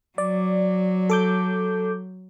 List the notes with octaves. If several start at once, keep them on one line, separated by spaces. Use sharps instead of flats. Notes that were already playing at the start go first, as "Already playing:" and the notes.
F#3 D5
A4 D6 G6